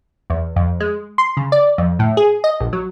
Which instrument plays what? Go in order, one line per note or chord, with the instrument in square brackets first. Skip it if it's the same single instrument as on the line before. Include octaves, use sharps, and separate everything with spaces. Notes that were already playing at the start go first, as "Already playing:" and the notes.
[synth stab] E2
F2
G#3
C6
C#3
D5
F2
A2
G#4
D#5
A#1
F#3